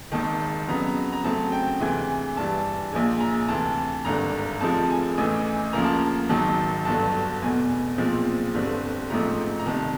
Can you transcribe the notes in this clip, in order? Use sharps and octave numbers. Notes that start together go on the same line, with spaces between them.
G#1 G#2 D#3 A5
F2 C#3 F#3 B3 A#5
A#5
A#5
F#2 C#3 F#3 A3 C4 A5
G5
D2 C3 E3 G#3 G#5
G2 E3 G3 A5
A#1 A#2 F3 G#3 G#5
A#5
D2 C3 E3 A5
G#1 G2 D3 A#5
F1 F2 C3 F3 G#3 A5
G#5
A1 A2 E3 G#5
D2 C#3 F3 A#3 A#5
A5
A#5
G#1 G#2 D#3 F#3 A5
G1 G2 D3 F#3 A5
F1 E2 B2 G#5
B1 A#2 F3 G#3 C4
G1 G2 D3 G3 C4
A1 G#2 F3 A3 C4 A#5
A#5
C2 C3 D#3 A5